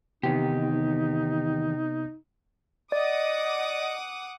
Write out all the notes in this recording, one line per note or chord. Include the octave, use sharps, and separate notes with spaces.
E2 C3 D#3 B3 D#4 G4
D5 D#5 F#5 D6 D#6